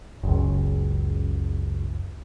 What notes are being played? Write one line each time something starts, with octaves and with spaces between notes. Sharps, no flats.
F#1 C#2